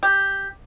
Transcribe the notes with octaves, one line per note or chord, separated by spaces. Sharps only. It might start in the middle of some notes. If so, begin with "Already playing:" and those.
G4